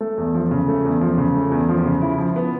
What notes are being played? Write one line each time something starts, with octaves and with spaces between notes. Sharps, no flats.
A3
E2
F3
C#3
A3
E2
F3
C#3
A3
E2
F3
C#3
E4
F3
B3